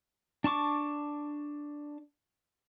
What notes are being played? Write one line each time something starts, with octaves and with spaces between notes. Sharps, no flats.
D4 A5 C#6 D6